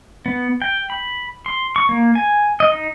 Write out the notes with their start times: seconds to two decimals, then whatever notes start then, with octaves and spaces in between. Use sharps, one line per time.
0.26 B3
0.62 G5
0.90 B5
1.46 C6
1.76 C#6
1.89 A#3
2.15 G#5
2.60 D#5
2.72 D#4